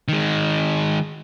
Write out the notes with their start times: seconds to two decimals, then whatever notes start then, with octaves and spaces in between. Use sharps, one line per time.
0.08 D#3 G#3